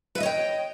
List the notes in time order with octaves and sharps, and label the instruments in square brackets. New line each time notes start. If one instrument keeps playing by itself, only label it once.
[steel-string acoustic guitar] B4
E5
D#5
C#5
G5